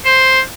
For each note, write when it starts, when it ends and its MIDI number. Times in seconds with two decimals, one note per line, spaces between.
0.05 0.40 72